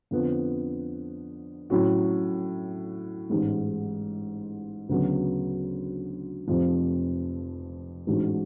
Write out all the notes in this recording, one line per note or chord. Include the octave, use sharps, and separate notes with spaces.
F2 D3 F3 B3
A2 F#3 C#4 F#4
A1 G#2 G#3
D2 C#3 F#3 B3
F1 F2 F3
A1 G#2 G#3 D4 F#4